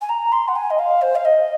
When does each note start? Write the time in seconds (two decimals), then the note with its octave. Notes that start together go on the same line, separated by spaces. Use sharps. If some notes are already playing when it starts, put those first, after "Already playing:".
0.01 G#5
0.08 A#5
0.32 C6
0.47 F#5
0.55 G#5
0.70 D#5
0.78 F5
1.01 C5
1.15 F5
1.24 D#5